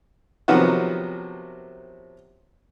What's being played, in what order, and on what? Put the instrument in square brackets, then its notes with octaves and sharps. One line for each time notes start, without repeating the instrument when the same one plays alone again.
[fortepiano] C3 D#3 F3 F#3 B3 F#4